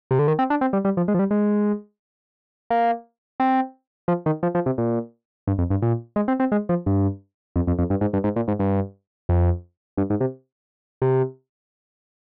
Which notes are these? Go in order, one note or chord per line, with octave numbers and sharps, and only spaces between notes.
C3
D3
D#3
C4
D4
C4
G3
G3
F3
G#3
F3
G3
G#3
A#3
C4
F3
D#3
F3
F3
C3
A#2
G2
F2
G2
A#2
G#3
C4
C4
G#3
F3
G2
F2
F2
F2
G2
G#2
G2
G#2
A#2
G#2
G2
F2
G2
G#2
C3
C3